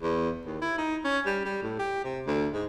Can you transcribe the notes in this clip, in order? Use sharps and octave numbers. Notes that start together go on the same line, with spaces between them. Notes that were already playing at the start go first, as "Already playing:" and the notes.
E2
D#2
E4
D#4
C#4
G3
G3
A2
G4
C3
D2
G#2